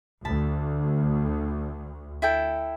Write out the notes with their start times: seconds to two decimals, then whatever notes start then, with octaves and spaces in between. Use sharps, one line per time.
0.25 D2 A5 B5
2.22 E4 A4 G5